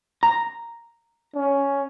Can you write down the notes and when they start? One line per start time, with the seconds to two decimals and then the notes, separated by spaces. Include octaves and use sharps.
0.23 A#5
1.35 C#4